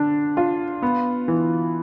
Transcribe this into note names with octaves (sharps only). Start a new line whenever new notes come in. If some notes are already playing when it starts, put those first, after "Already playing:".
Already playing: D3 D4
F4
B3
E3